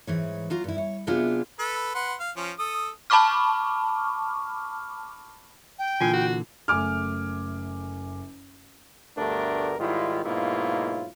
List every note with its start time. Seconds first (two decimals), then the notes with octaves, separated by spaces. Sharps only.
0.07 G#2 E3 C#5
0.50 F#3 F4 A#5
0.64 G2 E4
0.78 C#5
1.07 C3 F#3 B3 D4 F4 G#4
1.59 A4 B4
1.95 B4 F#5 C6
2.20 F5
2.37 F3 C#4
2.59 A4 D#6
3.10 A5 B5 C#6 D6 F6
5.78 G5
6.00 A#2 D3 E3 F4 G#5 C7
6.13 F#4
6.68 F#1 A3 G#5 D6 F6
9.18 D2 G2 A3 B3 D4 A#4
9.79 G#2 D#3 G3 E4 F4
10.25 G#2 B2 F#3 A#3 E4 F4